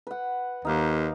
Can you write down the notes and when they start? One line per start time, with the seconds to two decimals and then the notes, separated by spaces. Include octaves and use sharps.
0.07 B4 F#5
0.65 D#2 D#4 F5 D6